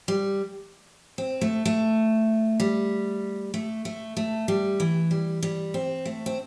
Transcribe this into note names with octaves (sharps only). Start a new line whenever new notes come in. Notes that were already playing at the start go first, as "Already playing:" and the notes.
G3
C4
A3
A3
G3
A3
A3
A3
G3
E3
G3
G3
C4
A3
C4